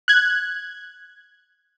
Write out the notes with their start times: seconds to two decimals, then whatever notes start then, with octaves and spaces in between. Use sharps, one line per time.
0.08 F#6 G#6